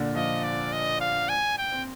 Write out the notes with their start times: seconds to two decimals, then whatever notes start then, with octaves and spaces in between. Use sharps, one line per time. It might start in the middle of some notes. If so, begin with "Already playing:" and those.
Already playing: A#2 D3
0.15 F3 D#5
0.44 D5
0.73 D#5
1.01 F5
1.29 G#5
1.58 G5
1.72 C4